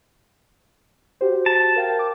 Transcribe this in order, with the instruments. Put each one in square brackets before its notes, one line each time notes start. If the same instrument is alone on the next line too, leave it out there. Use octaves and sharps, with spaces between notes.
[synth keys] F#4 G4 C5
[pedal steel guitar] A5
[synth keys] A#4 F5 G5
D6